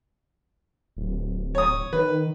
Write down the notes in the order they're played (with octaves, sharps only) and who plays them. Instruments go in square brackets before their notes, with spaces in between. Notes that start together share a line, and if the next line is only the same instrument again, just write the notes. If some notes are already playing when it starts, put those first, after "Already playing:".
[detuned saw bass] D1
[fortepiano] C#5 D#6
[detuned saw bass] D#3 [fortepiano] B4